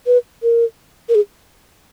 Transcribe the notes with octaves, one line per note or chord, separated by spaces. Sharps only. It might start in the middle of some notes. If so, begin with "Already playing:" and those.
B4
A#4
A#4
G#4